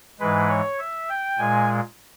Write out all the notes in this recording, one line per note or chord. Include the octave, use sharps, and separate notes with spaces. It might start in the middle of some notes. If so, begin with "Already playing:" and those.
G#2 E3 G#3 B4
C#5
E5
G5
A#2 G#3 G#5